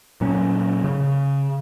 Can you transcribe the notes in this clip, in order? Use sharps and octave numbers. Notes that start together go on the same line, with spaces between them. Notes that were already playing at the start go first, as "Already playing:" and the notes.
A#2 F#3 C#4
C#3